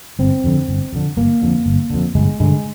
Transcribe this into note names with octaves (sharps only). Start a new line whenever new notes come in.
G1 C4
F2 D3
G1
F2 D3
G1 A#3
F2 D3
G1
F2 D3
G1 G#3
G2 D3 G#3